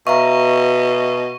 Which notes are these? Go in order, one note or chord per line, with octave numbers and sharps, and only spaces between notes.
B2 E5 F5 A#5 C#6